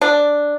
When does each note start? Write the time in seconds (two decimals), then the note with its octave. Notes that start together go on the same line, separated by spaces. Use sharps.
0.01 D4